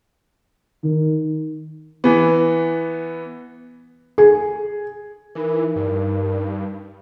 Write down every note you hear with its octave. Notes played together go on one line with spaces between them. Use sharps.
D#3
E3 B3
G#4
E3 D#4 A#4
G2